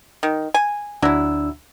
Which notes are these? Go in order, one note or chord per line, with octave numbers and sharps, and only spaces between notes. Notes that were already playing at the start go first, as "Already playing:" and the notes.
D#3
G#5
D2 F#3 D4 E4 E6